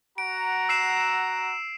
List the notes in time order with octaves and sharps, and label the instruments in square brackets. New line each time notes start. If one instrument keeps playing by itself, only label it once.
[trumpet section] F#4 F#5 A#5 [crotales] D7
[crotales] E6 C7 E7